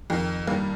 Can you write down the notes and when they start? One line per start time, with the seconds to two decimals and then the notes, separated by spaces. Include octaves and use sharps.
0.10 F2 D#3
0.47 G2 D#3 A#3